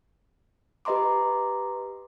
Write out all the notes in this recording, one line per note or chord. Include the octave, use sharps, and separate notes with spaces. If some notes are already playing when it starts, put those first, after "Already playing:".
G4 B4 D#5 A#5 C6 D6